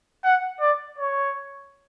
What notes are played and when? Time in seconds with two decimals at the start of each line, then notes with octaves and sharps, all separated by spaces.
0.24 F#5
0.60 D5
0.98 C#5